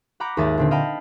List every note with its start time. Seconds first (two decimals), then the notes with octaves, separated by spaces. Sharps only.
0.20 F#5 A#5 B5 D6 G6
0.37 G#1 D#2 A#4 E5 D#6 A6
0.58 A#2 D3 C4
0.71 D#5 F5 G5 A5 B5